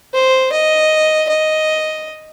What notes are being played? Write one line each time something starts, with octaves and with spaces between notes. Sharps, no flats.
C5
D#5
D#5